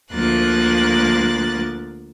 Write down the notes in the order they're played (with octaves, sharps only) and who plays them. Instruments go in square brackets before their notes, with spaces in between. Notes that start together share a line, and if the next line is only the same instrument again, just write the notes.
[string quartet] D2 F3 A#3 F#6 A6